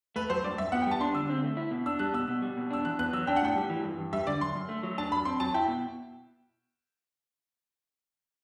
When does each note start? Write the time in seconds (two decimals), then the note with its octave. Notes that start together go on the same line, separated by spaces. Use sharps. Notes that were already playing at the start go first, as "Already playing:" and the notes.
0.16 A3 B4
0.30 F#3 C5
0.44 G2 D5
0.58 G2 E5
0.72 B3 F#5
0.82 G5
0.86 G3 A5
1.00 D4 C6
1.14 D3 E6
1.30 C4
1.44 A3
1.57 E4
1.71 B2
1.86 D4 E6
1.99 G3 F#6
2.13 B2 E6
2.28 B2
2.42 G3
2.57 B2
2.71 D4 E6
2.85 E2 F#6
2.99 B3 F#6
3.13 F#3 E6
3.27 D4 G5
3.36 F#5
3.42 A2 G5
3.56 G3
3.69 E3
3.84 G2
3.98 G2
4.13 G3 E5
4.27 D3 D5
4.41 F#2 C6
4.55 F#2
4.69 A3
4.83 F#3
4.98 D4 A5
5.11 F#2 B5
5.25 C4 C6
5.40 F#3 A5
5.54 E4 G5
5.68 B2